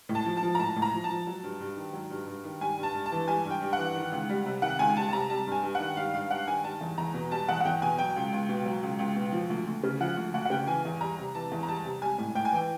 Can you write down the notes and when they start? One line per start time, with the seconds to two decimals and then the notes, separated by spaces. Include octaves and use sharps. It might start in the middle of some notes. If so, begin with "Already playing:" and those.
0.09 A2
0.15 A5
0.26 F3
0.37 A5
0.43 F3
0.55 A#5
0.59 A2 A5
0.76 A2
0.82 A#5
0.93 F3
1.04 A5
1.10 F3
1.27 F#3
1.43 G2
1.60 G2
1.77 D#3
1.93 F#3
2.10 G2
2.27 G2
2.44 D#3
2.61 G3 G#5
2.78 G2
2.83 A5
2.95 G2
3.06 A5
3.12 E3
3.28 G3 G#5
3.45 G2
3.51 G5
3.62 G2
3.73 F#5
3.78 E3
3.95 D#3
4.12 C#2
4.29 G3
4.45 C3
4.62 D#3 F#5
4.79 C#2 G#5
4.97 G3 A5
5.09 A5
5.13 C3 A#5
5.30 G3 A5
5.47 G2
5.52 G#5
5.63 G2
5.75 D#3 F#5
5.97 G3 F5
6.13 G2 F5
6.30 G2 F#5
6.47 D#3 G#5
6.64 G3 A5
6.81 E2
6.98 E2 A#5
7.14 B2
7.31 G3 A5
7.48 E2 F#5
7.60 F#5
7.65 E2 G5
7.82 B2 G#5
7.98 F#3 G5
8.16 C#2
8.32 C#2
8.49 B2
8.65 F#3
8.82 C#2
8.99 C#2
9.16 B2
9.32 F3
9.50 D2
9.67 D2
9.83 C#3
10.00 F3 F#5
10.17 D2
10.34 D2 F#5
10.45 F#5
10.50 C#3 G5
10.67 E3 G#5
10.85 E2
11.01 G3 A#5
11.18 C3
11.35 E3 A5
11.51 E2
11.63 A#5
11.68 G3 A5
11.85 C3
12.02 G3 G#5
12.18 A2
12.35 A2 G5
12.45 G#5
12.53 E3 G5